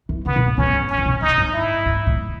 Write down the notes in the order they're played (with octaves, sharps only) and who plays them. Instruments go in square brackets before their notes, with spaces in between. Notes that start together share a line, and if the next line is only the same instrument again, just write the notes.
[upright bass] E3
[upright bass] C#3 [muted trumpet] B3
[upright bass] B2
A2
[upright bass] G#2 [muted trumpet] C#4
[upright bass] G#2
[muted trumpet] C#4
[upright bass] D#3
B2
[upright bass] G#2 [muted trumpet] D#4
[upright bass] G#2
[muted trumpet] E4
[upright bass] G#2
A2